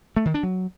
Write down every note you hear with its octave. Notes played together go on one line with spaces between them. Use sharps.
A3
D#3
D4
F#3